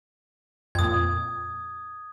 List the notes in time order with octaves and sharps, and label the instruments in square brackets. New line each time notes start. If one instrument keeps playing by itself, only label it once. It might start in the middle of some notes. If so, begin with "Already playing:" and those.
[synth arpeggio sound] F2 A#2 [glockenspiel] D#6 G#6